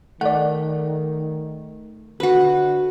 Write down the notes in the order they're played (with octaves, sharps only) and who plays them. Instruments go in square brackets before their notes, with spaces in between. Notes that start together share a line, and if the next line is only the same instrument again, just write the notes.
[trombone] D#3 [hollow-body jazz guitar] A3 [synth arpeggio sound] D5 F#5
[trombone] D3 [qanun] F#4 B4